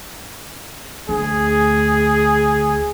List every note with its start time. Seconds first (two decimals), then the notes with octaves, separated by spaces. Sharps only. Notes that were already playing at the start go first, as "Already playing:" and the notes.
1.09 D2 G#4